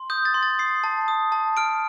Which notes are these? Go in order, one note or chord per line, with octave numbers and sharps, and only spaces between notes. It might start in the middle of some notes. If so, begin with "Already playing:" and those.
Already playing: C6
D#6 G6
A6
C6
A6
D#6 C7
A5
D#6
A5
F6 D7